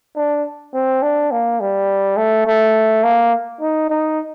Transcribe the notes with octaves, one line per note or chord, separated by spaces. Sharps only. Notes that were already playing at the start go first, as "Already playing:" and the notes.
D4
C4
D4
A#3
G3
A3
A3
A#3
D#4
D#4